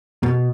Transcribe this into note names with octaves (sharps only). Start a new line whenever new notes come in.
B2